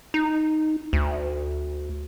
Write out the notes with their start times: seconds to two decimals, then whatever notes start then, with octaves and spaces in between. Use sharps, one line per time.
0.14 D#4
0.93 D2